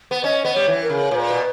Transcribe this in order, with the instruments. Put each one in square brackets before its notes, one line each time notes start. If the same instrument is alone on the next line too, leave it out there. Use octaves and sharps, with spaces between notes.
[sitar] B3
[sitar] C#4 [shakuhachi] D#5
[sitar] B3
[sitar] G3 [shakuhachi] C#5
[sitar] E3
[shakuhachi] A#4
[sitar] C#3
[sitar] A#2 [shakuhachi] B4 C#5
[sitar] B2